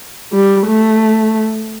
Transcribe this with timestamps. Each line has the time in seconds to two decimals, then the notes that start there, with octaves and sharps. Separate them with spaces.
0.33 G3
0.67 A3